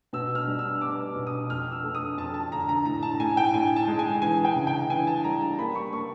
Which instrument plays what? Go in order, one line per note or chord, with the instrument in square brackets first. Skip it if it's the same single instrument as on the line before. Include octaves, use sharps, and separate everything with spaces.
[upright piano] B2 E6
F6
G3
E6
B3 D6
B2
D#6
F2 F6
E6
A3
D#6
F2 A5
A5
D3 A#5
A#5
A2 A#5
A5
A2 G#5
G5
A2 G#5
A5
G#3
G#5
E3 G#5
G5
C#3
G5
E3 G#5
A5
G3 A#5
A5
A#3 B5
C#6
A#3 C#6